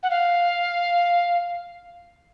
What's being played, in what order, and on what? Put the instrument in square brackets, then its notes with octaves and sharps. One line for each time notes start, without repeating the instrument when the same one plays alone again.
[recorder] F#5
F5